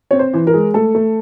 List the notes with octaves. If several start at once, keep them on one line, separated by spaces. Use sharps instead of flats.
C4 C#5
C5
E3
A#4
G#3
A3 A4
A3